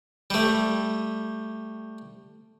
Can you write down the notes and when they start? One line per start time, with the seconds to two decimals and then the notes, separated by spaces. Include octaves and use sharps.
0.30 G3 A3